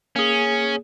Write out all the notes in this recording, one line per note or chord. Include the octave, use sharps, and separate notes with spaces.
A#3 C#4 G#4